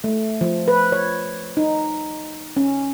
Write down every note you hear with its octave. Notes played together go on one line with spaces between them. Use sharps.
A3
F3
B4
C#5
D#4
C#4